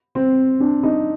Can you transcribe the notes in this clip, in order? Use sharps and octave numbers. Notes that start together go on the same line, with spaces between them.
C4
D4
D#4